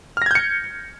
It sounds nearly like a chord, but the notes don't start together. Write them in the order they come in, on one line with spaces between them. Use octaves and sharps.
F6 A#6 G#6 G6 C#7